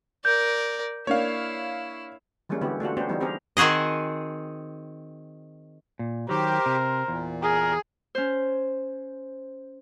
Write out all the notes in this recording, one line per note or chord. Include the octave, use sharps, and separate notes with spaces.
A#4 D5 G6
A#3 D4 E4 C#5 F5
E3 G3 G#3 A#3 C#4
D3 B3 E4 F#4 G4
A3 D4 F4 F#4
B3 C#4 D4 G4 C5
E3 G3 B3 D#4
C4 G4 G#4 A#4
D#3 C4 F#4 G#4 D#5
A#2
D#3 F#3 G4 A#4 C5
C3
E2 A#2
G#4 A#4
C#4 C5